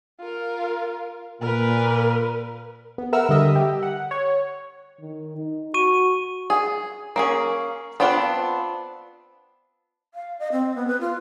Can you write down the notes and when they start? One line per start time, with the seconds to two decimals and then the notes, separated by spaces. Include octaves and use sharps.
0.20 F4 A#4
1.41 A#2 A#4 B4
2.98 B3
3.13 A#4 B4 E5 F#5 E6 F6
3.29 D3 G3 D#5 E5
3.56 G4
3.83 F#5
4.11 C#5
5.01 D#3
5.38 D#4
5.74 F#4 C#6 D#7
6.50 G#4
7.16 A#3 C#4 G#4
8.00 B3 C4 D4 F4
10.14 F5
10.39 D#5
10.52 C4
10.76 B3
10.88 B4
11.01 F4